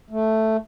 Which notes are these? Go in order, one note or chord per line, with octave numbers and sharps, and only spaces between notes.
A3